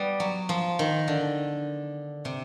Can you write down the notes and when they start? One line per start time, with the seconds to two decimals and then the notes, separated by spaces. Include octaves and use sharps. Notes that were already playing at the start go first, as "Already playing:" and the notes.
Already playing: G3 B3
0.20 F#3
0.49 F3
0.79 D#3
1.08 D3
2.25 C3